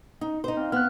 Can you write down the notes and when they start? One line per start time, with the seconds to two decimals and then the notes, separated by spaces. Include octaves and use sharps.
0.21 D#4
0.44 D#4 C5
0.57 C4 F5
0.72 B3 F6 F#6